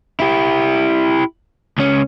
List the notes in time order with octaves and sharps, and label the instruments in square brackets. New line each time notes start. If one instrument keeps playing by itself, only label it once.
[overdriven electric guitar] E4 G4
C#2 C#4